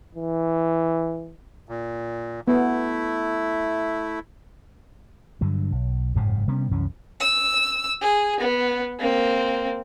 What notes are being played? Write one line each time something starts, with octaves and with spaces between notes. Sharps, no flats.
E3
A#2
A3 B3 E4
G2 D3 F#3
B1
F#1 F2 G#2 C3
C3 G3 B3 C#4
C2 F#2 E3 C#4
E6
G#4
B3
A#3 C4